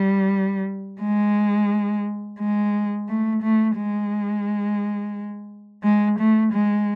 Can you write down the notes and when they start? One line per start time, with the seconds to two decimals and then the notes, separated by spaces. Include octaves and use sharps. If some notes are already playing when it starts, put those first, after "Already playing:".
Already playing: G3
1.01 G#3
2.39 G#3
3.09 A3
3.43 A3
3.77 G#3
5.83 G#3
6.19 A3
6.53 G#3